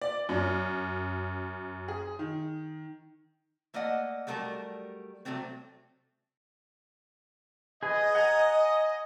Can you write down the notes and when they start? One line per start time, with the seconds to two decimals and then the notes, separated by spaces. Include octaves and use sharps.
0.02 D5
0.29 F#2
1.88 G#4
2.19 D#3
3.74 A3 A#3 D5 D#5 F#5
4.27 F#3 G3 A3 A#4 B4 A5
5.25 C3 F#3 G3 A3 C4
7.83 G#4 B4 D#5
8.15 F#5 G#5 A#5